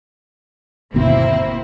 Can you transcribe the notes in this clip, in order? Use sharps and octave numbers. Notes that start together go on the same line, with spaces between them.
G1 D#2 B2 A#3 C4 E4